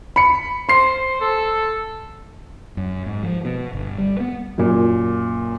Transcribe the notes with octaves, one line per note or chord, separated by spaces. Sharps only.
B5 C#7
C5 C6 C7
A4
F#2
G#2
F3
B2
G1
G3
B3
F#2 A#2